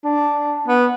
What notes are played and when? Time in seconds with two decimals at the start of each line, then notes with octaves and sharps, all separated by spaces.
0.04 D4
0.67 B3